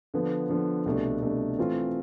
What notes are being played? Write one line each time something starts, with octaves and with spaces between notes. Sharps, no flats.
D3 F3 B3
D3 F3 B3
C2 B2 A3 D4
C2 B2 A3 D4
E3 A3 C4 F4